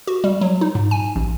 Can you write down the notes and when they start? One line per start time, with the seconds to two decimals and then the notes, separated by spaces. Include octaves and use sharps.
0.07 F#4
0.24 G3
0.41 F#3
0.61 D#4
0.75 G#2
0.91 G#5
1.16 A1